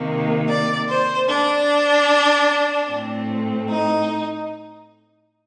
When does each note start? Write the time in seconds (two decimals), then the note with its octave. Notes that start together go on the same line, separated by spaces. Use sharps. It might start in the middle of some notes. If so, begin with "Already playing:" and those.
Already playing: C3 D#3 A#3
0.47 D5
0.88 C5
1.27 D4
2.87 A2 A3 C4
3.67 D#4